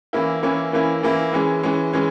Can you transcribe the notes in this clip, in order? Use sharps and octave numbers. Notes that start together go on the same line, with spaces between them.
E3 A#3 C#4 E4
E3 A#3 C#4 E4
E3 A#3 C#4 E4
E3 A#3 C#4 E4
E3 G#3 C#4
E3 G#3 C#4
E3 G#3 C#4